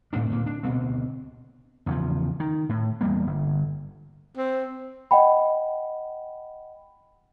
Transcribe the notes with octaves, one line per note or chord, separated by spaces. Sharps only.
A2 A3 C4 D4
D1 A#2 A#3
D4
D2 B2 A#3 C4
E2 C#3 F3
D#3
A2
E2 G3 A#3
G1
C4
D#5 F#5 G5 B5